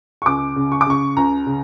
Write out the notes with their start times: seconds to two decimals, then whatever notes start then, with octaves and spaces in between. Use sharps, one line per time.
0.22 C#6
0.26 C#2 D6
0.56 C#3
0.72 C#6
0.81 D6
0.86 C#3 C#6
1.17 C#2 A#5
1.47 C#3